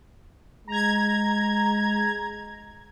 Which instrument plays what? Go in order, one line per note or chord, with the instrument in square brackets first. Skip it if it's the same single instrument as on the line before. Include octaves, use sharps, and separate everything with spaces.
[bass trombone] G#3 [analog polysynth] A#5 G#6